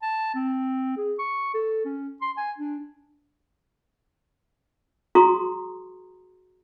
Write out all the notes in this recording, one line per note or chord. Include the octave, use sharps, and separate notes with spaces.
A5
C4
G#4
C#6
A4
C#4
C6
G#5
D4
F#4 G#4 A#5 C6 C#6 D#6